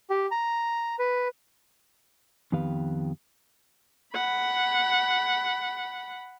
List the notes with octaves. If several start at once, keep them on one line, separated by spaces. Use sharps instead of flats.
G4
A#5
B4
F2 D#3 B3 G4 B4 F5
F#5 B5